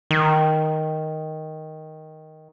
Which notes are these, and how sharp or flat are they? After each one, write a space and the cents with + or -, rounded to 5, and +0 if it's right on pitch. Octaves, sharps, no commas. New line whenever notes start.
D#3 +5